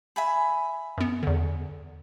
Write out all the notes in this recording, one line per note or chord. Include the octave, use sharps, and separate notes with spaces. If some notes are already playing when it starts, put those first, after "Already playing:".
E5 G#5 B5
F#2 B3
E2 D3